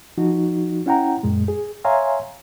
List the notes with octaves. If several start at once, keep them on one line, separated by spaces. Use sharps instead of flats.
F3 D#4 F#4
C#4 E4 F#5 G5 A#5
F#2 A#2 G#3
G#4
C#5 E5 F5 G#5 A#5 C6